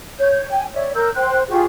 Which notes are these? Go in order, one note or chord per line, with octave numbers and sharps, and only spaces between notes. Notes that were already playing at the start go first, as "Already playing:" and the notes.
C#5 G6
G5 G#5
C#5 D5 E5
A#4 E6 G6
C5 G5 F#6
F4 G4 G#4 C#6